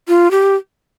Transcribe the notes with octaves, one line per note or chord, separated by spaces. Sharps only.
F4
G4